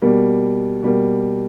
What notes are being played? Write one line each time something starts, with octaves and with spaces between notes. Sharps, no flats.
B2 G3 A#3
B2 G3 A#3